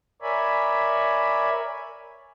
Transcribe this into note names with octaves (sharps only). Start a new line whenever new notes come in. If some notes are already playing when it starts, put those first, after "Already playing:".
A#4 C#5 D5 E5 G#5 B5